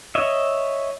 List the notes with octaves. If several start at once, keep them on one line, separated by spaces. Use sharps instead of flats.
C#5 D#5 E5